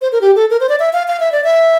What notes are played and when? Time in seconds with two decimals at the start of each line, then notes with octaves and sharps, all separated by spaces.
0.02 C5
0.12 A#4
0.21 G4
0.36 A4
0.50 A#4
0.60 C5
0.69 D5
0.80 E5
0.93 F5
1.08 F5
1.20 E5
1.32 D5
1.44 E5